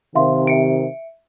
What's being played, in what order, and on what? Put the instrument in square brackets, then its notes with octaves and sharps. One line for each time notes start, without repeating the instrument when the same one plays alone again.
[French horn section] C3 D#3 [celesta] E5 F5 C6
[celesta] E5 C#7 D7